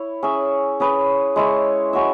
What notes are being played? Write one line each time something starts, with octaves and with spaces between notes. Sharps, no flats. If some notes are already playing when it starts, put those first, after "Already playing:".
Already playing: E4 C#5
C#4 G#4 E5
C#4 G#4 B4
G#3 E4 C#5
C#4 F#4 E5